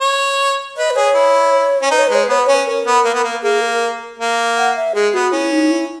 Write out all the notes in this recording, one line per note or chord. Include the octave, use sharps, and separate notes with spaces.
C#5
B4 D#5
B4
G#4 C#5
E4
C#4
D#4 B4
C#5
B4
G#3 C#5
B4
B3 C#5
B4
C#4 C#5
B4
C#4 A#4
B3
A#3
B3
A#3
A#3 G#4
A#4
A#3
F#5
E5
G#3 G#4
B3 F#4
C#4 E4
D#4
E4